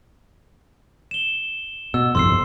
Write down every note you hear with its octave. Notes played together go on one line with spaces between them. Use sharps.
E7 G7
B2 E6
G1 C2 F2 C6 E6 C7